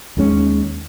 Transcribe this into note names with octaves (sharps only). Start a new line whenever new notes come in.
D#2 D#3 G#3 C#4